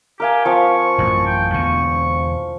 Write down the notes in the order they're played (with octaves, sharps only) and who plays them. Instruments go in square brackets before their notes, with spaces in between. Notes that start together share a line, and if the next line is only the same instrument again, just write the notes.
[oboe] G4 [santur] A#4 F5 G#5
[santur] F3 C4 F5 [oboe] C#6
[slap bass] A1 F#2
[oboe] G5
[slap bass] E2 B2 D3 [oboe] C#6